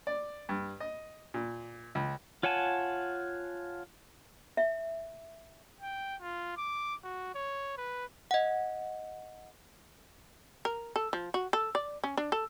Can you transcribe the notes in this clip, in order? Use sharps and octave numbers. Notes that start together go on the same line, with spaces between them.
D5
G2
D#5
A#2
C#2
F4 C#5 F#5 G#5 A5
E5
G5
F4
D6
F#4
C#5
B4
D#5 F#5
A#4
A4
F3
F#4
A4
D5
C#4
D4
A4